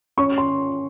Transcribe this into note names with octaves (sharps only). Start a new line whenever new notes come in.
C#4 C#6
C6